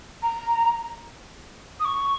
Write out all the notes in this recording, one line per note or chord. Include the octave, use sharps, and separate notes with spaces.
A#5
D#6
C#6